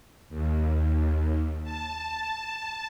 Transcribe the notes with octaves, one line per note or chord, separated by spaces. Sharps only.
D#2
A5